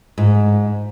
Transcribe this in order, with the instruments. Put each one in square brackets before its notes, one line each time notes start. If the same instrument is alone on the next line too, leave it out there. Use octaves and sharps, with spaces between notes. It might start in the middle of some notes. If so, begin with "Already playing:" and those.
[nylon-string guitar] G#2